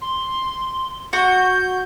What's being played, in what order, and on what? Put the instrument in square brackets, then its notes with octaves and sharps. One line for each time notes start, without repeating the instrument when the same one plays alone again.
[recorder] C6
[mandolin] F#4 [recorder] G6